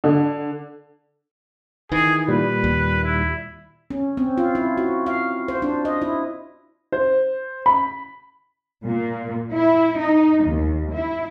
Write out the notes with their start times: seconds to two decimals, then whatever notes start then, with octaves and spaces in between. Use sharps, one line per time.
0.04 D3
1.92 D#3 E3 G#4
2.28 A#2 G3 B4
2.64 D#2
3.04 E4
3.90 C#4
4.17 C4
4.38 F4
4.55 E4
4.78 F#4
5.06 F5
5.48 C5
5.62 D4
5.85 D#5
6.02 E4
6.92 C5
7.66 B5
8.85 A#2
9.53 E4
9.99 D#4
10.45 D#2
10.93 E4